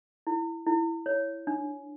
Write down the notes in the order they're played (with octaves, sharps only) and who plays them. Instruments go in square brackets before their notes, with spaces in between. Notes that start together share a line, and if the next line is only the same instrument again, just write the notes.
[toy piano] E4
E4
C#5
D4